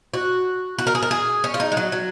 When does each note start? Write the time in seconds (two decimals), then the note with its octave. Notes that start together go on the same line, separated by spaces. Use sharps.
0.14 F#4
0.78 F#4
0.87 A#4
0.95 G#4
1.03 A#4
1.11 G#4
1.44 C#4
1.54 F4
1.60 D#4
1.72 G#3
1.77 F#3
1.92 F#3